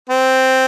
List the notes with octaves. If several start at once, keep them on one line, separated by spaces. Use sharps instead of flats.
C4